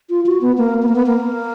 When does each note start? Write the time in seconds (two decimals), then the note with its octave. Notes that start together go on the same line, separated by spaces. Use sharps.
0.10 F4
0.26 F#4
0.41 B3
0.58 A#3
0.82 B3
0.88 A#3
0.96 B3
1.06 A#3